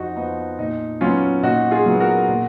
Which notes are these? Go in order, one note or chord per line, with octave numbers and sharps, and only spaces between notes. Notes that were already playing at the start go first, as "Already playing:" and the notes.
Already playing: F2 D#4 F#4
F3 B3 D#4
A#2 D#4
F#3 B3 C#4 F4
A#2 D#4 F#4
F4 G#4
F#3 B3
F#4 A#4
A#2